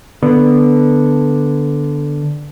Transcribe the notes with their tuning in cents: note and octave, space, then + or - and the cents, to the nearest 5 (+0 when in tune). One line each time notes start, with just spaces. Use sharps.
D3 +0 B3 +0